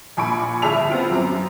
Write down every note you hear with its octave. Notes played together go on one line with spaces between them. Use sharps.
A#1 A#2 G#5 B5 C#6 D7
G1 G#4 E5 A5 F7
B3 C4 F4
F#2 F#3 A#5